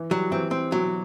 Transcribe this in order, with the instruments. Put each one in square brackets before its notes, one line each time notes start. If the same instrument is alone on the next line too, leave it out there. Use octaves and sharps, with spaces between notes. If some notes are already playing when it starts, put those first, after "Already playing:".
Already playing: [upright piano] E3
[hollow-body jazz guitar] F#3 [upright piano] G3
[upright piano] E3 [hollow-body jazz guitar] C4
[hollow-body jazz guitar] C4
[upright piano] B2 [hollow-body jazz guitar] F#3